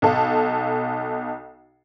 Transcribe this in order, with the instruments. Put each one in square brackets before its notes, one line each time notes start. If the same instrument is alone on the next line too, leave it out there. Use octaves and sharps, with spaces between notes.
[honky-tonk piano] B1 A4 F5